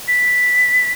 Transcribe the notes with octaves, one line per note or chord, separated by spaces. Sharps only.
B6